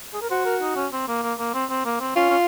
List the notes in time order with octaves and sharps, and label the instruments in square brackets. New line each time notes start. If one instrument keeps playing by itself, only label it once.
[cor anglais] G#4
A#4
[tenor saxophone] F#4 [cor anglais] C5
[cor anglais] A#4
D#4
C#4
C4
A#3
A#3
A#3
C4
C4
A#3
C4
[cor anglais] C#4 [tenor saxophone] F4
[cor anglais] C#4